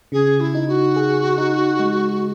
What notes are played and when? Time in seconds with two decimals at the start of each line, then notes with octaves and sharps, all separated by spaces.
0.12 C#3 G#4
0.40 E4
0.55 D#4
0.68 F#4
0.96 G#4
1.38 D#4
1.79 G#3